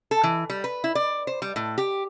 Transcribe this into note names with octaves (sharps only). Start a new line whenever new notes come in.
A4
E3
G3
B4
E4
D5
C5
G3
A2
G4